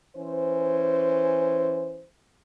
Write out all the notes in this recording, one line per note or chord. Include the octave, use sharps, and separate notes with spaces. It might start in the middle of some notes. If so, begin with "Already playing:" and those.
E3 C#4 C5